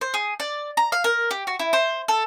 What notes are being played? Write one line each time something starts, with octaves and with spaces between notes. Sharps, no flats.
C5
G#4
D5
A#5
F5
A#4
G4
F#4
E4
C5
A4